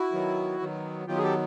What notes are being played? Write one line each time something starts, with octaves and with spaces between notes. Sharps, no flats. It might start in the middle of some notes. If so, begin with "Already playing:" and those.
Already playing: E4 F#4
D#3 F#3 B3
D#3 F#3 B3
D#3 F#3 B3 F4 G4
G#4
G4 A4